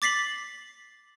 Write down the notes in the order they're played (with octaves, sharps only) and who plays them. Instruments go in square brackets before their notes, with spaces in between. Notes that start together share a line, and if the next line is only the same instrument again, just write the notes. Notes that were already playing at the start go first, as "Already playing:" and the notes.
[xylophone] D6 A6 B6 C7 F#7